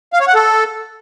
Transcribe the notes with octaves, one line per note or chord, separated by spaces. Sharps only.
F5
C#5
F#5
A4